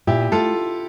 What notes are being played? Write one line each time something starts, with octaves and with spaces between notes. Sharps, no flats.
A#2 E4 G4
A3 F4 A4